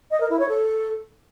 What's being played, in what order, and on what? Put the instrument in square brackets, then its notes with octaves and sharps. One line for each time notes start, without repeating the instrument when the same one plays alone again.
[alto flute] D#5
A#4
E4
C#5
A4